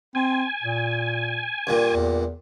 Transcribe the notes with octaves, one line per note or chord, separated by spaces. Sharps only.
C4 G#5
A#2
G2 A#2
E2